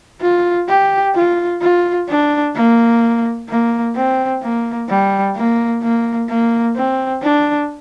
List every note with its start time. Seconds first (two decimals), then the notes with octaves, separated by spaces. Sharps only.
0.21 F4
0.68 G4
1.15 F4
1.61 F4
2.08 D4
2.55 A#3
3.49 A#3
3.95 C4
4.42 A#3
4.89 G3
5.35 A#3
5.82 A#3
6.29 A#3
6.76 C4
7.22 D4